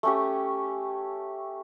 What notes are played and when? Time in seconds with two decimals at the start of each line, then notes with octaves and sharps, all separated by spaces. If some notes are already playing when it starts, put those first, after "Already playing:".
0.03 A3 C#4 G4